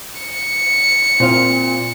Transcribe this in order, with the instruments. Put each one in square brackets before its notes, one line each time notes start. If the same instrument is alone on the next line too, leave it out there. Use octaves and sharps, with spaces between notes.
[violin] C#7
[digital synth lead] A#2 [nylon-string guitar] C4 F4